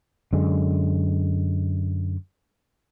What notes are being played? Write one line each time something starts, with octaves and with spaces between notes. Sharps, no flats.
F#2 D3 G#3